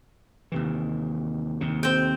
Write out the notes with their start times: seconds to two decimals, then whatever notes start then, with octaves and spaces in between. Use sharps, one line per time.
0.52 D#2 C3 E3
1.61 D#2 C3
1.83 C4 G5